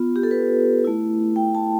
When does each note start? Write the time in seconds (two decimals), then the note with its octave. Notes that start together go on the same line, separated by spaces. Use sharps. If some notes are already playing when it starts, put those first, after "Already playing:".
Already playing: B3 F4
0.16 G4
0.23 A4
0.31 B4
0.84 A3 E4
1.36 G5
1.55 A5